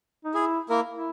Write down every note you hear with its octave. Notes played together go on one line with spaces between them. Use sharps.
D#4
E4 G#4
A#3 E4 A#4
E4